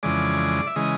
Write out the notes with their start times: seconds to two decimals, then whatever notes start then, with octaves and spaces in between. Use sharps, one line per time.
0.03 F2 C#3 E3 G#3 D5
0.67 E5
0.76 C#3 E3 G#3 D#5